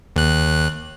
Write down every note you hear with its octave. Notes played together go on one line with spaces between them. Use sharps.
D#2 F#6